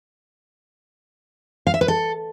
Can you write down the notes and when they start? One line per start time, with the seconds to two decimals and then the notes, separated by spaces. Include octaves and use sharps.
1.67 F5
1.74 E5
1.81 B4
1.88 A4